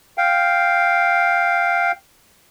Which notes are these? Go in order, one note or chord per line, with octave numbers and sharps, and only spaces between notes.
F5 G5